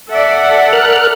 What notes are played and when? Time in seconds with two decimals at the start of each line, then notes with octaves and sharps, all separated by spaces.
0.11 A4 D5 E5 F#5
0.73 A#4 F6 F#6